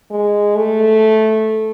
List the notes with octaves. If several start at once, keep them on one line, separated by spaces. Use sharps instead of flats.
G#3
A3